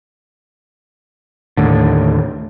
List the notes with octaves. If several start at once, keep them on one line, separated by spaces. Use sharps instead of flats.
D#2 A2 D3